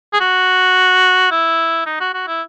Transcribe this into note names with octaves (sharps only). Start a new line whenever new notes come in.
G#4
F#4
E4
D#4
F#4
F#4
E4